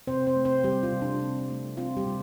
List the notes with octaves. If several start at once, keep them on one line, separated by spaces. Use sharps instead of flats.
C3 C4 C5
C4 C5
A3
C4 C5
G3 C4 G4
F4
C3
D4
C4
A3
C4 F4
G3 G4
C3